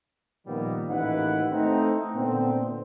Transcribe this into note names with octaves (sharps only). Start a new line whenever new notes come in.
A#2 D#3 F3 G3 A#3 B3
A1 D#2 D#4 E4 B4 F#5
A3 C4 D#4
A#2 D3 B3 C4